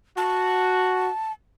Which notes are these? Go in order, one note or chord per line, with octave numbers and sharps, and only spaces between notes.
F#4 A5